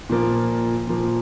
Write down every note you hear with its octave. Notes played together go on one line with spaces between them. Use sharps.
A#2 F3 A#3
A#2 F3 A#3